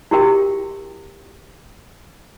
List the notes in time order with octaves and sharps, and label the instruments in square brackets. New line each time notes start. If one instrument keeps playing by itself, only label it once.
[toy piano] E4 F#4 G4 A#4 E5 G5